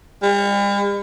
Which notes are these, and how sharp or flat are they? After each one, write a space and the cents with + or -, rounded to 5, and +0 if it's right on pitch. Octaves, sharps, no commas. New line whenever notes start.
G3 +45